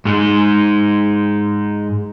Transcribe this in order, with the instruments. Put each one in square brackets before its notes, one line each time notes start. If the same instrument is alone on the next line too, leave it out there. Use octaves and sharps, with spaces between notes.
[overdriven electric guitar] G#2 G#3